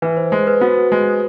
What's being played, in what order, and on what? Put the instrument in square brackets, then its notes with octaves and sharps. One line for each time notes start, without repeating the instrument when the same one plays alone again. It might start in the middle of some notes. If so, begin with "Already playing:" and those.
[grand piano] E3 [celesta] B4
[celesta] C5
[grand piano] G#3 [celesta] C5
[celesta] B4
[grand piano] B3 [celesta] F#4
[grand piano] G#3